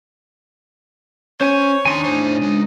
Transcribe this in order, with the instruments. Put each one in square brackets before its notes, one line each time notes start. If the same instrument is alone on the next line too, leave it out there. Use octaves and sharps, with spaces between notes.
[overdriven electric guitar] C#4 [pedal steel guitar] C5 G#5 [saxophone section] C#5
[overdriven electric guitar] D#2 C6 [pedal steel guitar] D4 D#4 G#5
[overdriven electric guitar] A2 C5
C#2 G#3